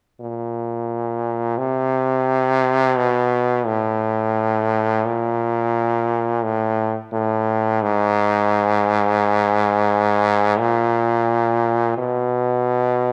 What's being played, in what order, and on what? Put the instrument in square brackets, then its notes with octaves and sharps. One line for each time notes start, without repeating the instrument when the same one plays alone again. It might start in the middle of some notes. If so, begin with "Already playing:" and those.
[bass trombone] A#2
C3
B2
A2
A#2
A2
A2
G#2
A#2
B2